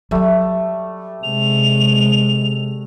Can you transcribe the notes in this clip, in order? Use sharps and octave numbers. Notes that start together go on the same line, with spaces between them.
F#3 G3 A3 E4
C3 G#3 F7